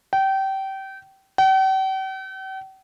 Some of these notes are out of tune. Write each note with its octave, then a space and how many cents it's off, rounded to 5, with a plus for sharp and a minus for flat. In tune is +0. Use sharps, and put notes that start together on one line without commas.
G5 -25
G5 -45